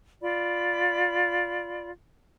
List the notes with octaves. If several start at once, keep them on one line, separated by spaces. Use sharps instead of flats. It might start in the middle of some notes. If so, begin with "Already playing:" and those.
F4 D5 B5